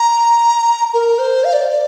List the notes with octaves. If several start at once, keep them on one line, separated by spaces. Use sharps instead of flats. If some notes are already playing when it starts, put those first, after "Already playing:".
Already playing: A#5
A#4
C5
F5
D5
C5
D5